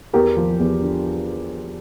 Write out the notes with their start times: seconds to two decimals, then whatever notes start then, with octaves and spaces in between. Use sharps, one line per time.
0.13 E2 G4 A#4
0.37 F3
0.59 E2
0.82 D3